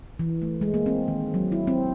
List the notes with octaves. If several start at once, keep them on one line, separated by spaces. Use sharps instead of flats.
E3
A3
G#3
A#3
C4
D#3
F#3
E4
C4